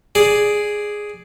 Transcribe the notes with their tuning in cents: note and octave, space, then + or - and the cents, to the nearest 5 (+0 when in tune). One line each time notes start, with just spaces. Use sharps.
G#4 +0 D5 +0